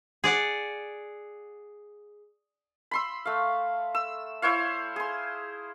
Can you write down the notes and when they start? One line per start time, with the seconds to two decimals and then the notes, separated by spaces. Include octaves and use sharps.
0.24 G#4 D5 F#5
2.91 B5 C6 E6
3.25 A3 F5
3.95 E6
4.42 E4 C5 C#5 F5
4.96 G#4 C6